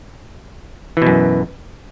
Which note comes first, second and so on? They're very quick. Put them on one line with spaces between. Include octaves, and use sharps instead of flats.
E3 B2 F#2